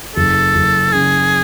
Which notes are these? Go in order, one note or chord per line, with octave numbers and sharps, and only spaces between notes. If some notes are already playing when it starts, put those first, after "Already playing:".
F#1 A4
F#1
C#3 G#4